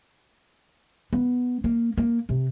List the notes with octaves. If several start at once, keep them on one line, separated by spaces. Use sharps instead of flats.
B3
A#3
A#3
C3